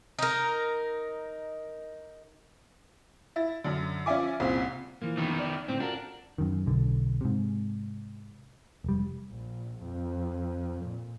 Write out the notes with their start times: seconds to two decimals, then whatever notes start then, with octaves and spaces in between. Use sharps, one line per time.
0.19 D#4 A#4
3.36 E4 A6
3.64 F#2 D3
4.06 F3 C#4 D5 E5 G#5 D6
4.40 C2 A#2 C#3 C4
5.02 E3 F3 A#3
5.17 D#3 B3
5.39 D5
5.68 A2 D3 C4
5.80 D4 F4 F#4 A#4
6.38 F#2 D#3
6.66 B1 D3
7.21 G#2 C3
8.84 F1 G3
9.31 A#1
9.85 F2
10.85 A#2